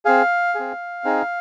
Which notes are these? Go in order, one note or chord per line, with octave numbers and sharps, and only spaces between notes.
C4 G#4 F5
C4 G#4
C4 D#4 G#4